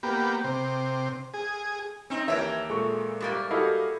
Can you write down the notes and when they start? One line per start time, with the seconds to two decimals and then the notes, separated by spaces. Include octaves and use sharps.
0.03 A#3 B3 G4
0.44 C3
1.34 G#4
2.10 C4 D#4
2.28 D#2 E3 G4 A#4 C#5 E5 D7
2.69 A#2 G#3 G#4 A4 C#6
3.20 G#2 G3 A#3
3.51 E4 F#4 G4 A4 D#5 F5